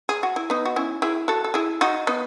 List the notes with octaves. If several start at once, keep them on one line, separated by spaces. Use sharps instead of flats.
G#4
F#4
E4
B3 D#4
F#4
C#4 E4
E4 G#4
F#4 A4
A4
E4 G#4
D#4 F#4
B3 D#4